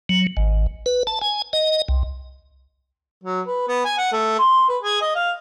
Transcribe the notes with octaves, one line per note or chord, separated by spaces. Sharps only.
F#3
G#1
B4
A5
G#5
D#5
C2
F#3
B4
B3
G#5
F#5
A3
C6
B4
G#4
D#5
F5